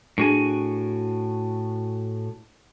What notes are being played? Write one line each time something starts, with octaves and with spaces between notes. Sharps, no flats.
A2 D4 F#4 G#4 G#5